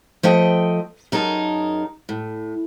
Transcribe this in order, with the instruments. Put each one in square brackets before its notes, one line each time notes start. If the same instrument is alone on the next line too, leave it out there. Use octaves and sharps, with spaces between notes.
[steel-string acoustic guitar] F3 A3 D#5 G5
F#2 D#4 G#4 A#4 A5
A2